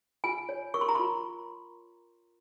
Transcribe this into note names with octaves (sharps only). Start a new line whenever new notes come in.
F4 G#5
C#5
A#4 C#6
C6
A#5
F4 C6